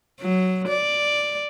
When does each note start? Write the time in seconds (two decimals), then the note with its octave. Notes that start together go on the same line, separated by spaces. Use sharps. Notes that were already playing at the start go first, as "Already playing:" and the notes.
0.21 F#3
0.68 D5